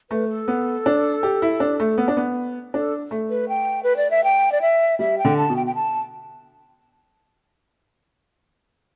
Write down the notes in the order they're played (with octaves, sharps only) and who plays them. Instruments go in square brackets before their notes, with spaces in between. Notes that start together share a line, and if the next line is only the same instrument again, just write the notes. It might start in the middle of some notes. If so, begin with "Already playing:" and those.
[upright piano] A3 [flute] B4
[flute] A4
[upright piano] B3
D4
G4
E4
D4
A3
B3
D4
B3
[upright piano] D4 [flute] A4
[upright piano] A3
[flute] B4
G5
B4
D5
E5
G5
D5
E5
[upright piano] G3 [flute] E5
[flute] G5
[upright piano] D3
[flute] A5
[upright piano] B2
[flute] G5
G5
A5